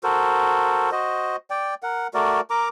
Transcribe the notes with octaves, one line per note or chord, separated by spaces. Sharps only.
F#4 A4 A#4 C5
F#4 C5 D#5
D5 G5
A#4 F#5
A3 F#4 A#4 D5
A#4 A#5 D6